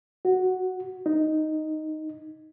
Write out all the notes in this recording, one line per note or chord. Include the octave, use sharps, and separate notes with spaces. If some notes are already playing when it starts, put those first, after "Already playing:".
F#4
D#4